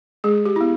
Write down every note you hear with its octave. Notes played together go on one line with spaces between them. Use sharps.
G#3 G#4
G4
B3 E4